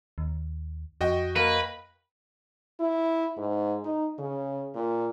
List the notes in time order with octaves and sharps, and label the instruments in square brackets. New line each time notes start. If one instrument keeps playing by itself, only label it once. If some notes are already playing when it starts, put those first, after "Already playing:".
[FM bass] D#2
[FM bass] F2 [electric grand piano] F#4 D#5 G5
[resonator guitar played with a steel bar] A#3 [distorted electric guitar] B4
[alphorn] E4
G#2
D#4
C#3
A#2